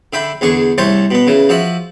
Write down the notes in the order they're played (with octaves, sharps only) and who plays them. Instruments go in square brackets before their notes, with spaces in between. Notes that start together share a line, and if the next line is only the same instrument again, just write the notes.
[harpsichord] D3 E5 G5 B5
E2 D3 G#4 C#6
C2 A3 C5 C#5 A5
B2 B3
C#3 E3
F3 F#4 E5